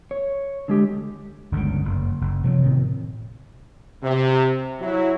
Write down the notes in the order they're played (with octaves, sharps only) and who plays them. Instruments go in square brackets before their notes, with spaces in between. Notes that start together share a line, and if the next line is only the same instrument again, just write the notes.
[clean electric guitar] C#5
D3 G#3 G4
[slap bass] G1 C#2 B2 D3
F#1
F#1
C3 F3 F#3
A2 C3 D#3
[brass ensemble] C3
F#3 E4